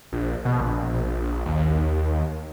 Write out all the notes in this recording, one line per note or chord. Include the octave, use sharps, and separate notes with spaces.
A#1
B2
A#1
D#2